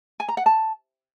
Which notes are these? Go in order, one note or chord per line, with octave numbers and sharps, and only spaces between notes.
G#5
A#5
F#5
A5